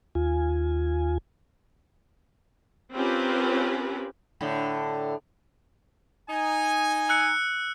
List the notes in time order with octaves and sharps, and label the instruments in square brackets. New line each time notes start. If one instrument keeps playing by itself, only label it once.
[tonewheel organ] D#2 F4 G#5
[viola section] C4 C#4 F4 G4 A#4 B4
[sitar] A2 D3
[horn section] D#4 G#5
[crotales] E6 F#6 C#7